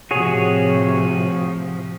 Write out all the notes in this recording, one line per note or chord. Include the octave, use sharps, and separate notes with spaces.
A2 C3 F3 F#4 G#4 C#5